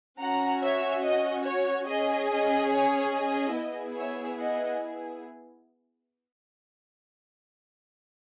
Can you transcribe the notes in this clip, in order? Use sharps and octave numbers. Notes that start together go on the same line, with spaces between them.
C#4 F#4 F#5 A#5
C#5 E5
D#5
C#5
C#4 G#4 D#5
D#5
C#5
D#5
B3 E4 G#4
C#5 E5
D#5 F#5